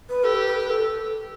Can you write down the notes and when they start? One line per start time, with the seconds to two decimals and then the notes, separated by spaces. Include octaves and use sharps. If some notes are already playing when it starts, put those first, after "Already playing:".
0.09 B4
0.23 G4 A4
0.35 B4
0.47 B4
0.59 B4
0.69 A4